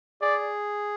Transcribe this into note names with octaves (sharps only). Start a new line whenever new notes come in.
G#4 D5